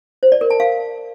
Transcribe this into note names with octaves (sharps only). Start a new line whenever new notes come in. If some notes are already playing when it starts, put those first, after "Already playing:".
C5
D5
A#4
A5
F5